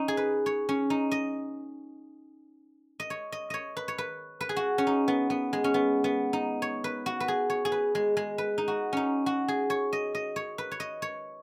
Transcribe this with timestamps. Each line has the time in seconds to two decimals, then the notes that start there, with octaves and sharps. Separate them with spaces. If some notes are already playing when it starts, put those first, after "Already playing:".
Already playing: C#4 D#4
0.08 G#4
0.17 B4
0.46 C#5
0.69 C#4
0.90 D#4
1.11 D#5
3.00 D#5
3.10 C#5
3.32 D#5
3.50 C#5 D#5
3.77 B4
3.88 C#5
3.98 B4
4.41 B4
4.49 G#4
4.56 F#4
4.78 C#4
4.87 D#4
5.08 B3
5.30 B3
5.53 G#3
5.64 C#4
5.74 B3
6.04 B3
6.33 D#4
6.62 C#5
6.84 B4
7.06 F#4
7.20 B4
7.28 G#4
7.50 C#5
7.65 G#4
7.72 B4
7.95 G#3
8.17 G#3
8.38 B4
8.58 D#4
8.68 F#4
8.93 C#4 D#4
9.26 F#4
9.48 G#4
9.70 C#5
9.93 D#5
10.15 D#5
10.36 C#5
10.58 B4
10.71 C#5
10.80 D#5
11.02 C#5